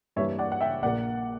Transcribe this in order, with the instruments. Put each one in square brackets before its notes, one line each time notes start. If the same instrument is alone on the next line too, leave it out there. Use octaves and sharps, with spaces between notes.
[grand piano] G2 E3 G3 A#3 D4 C#5 E5
D5 F#5
F#5
E5 G5
A#1 A#2 A#3 D5 F#5